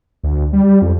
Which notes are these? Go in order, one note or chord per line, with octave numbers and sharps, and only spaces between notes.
D2
G3
F2